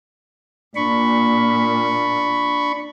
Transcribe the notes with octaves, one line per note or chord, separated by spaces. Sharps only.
A#2 D4 B5 C#6